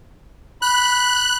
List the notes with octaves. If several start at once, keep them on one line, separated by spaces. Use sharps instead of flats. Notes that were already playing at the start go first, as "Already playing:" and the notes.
B5 F#6